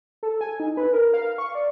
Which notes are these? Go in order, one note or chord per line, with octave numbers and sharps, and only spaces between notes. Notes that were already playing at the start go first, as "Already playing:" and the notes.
A4
G#5
D#4
B4
A#4
F5
C#6
D5